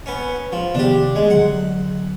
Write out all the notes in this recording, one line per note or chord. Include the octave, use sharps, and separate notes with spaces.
B3 C#4
F3
C3 D#3 B3 D4 G4
D2 G#3
D3 F#3 F#5